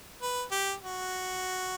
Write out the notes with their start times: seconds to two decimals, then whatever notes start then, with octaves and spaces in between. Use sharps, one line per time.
0.21 B4
0.51 G4
0.83 F#4